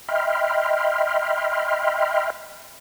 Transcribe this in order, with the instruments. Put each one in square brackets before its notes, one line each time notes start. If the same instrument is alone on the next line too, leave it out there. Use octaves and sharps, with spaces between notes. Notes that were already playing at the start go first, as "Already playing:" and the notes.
[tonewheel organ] D#5 E5 G5 B5 C6 F6